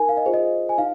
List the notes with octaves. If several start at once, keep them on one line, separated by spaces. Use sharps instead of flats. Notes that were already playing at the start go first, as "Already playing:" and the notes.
Already playing: D#4 A#4 G#5
F5
D#5
F4 G#4 C5
D#5
G#5
D#4 F5